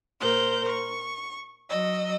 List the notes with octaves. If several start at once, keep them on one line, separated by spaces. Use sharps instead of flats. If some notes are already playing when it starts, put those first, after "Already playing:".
A#2 A#4 C5 G6
C#6
F#3 D#5 E6